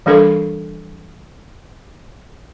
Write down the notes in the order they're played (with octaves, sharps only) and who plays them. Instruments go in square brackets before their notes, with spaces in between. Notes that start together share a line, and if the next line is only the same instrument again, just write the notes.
[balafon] E3 G3 D4 A4 A#4